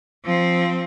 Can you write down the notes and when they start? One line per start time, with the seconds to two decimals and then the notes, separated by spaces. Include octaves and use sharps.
0.25 F3 C4